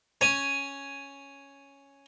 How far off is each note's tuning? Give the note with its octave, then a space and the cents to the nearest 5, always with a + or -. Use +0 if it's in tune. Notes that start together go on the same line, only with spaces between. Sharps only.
C#4 +0 G#5 +0